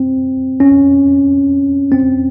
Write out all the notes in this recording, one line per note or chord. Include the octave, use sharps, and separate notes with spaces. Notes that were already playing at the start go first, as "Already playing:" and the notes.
Already playing: C4
C#4
C4